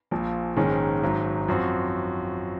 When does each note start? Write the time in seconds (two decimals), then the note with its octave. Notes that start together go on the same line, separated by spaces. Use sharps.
0.11 A#1 A#2 F3
0.56 A#1 G#2 D#3 G#3 C#4
1.02 G#1 G#2 D#3 F#3
1.48 F#2 F3 C4 F#4